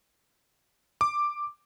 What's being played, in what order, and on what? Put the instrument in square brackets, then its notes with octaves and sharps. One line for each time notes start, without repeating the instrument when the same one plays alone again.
[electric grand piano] D6